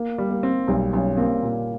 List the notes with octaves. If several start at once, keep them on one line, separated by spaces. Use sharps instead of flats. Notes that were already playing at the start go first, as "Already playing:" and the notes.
Already playing: A#3
G3
A#3
C4
B1 G3
B1 C#4
A#3 C4
A#2